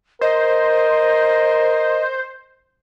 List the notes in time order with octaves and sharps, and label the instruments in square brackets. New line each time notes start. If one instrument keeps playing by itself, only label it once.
[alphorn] A#4 [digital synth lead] C5 [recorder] D#5